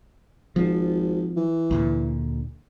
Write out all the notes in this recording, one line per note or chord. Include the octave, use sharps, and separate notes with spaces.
G#1 F3
E3
D2 A#2 D3